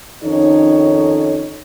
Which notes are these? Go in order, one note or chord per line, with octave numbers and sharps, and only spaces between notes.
F2 D#3 C#4 D#4 A4 C#5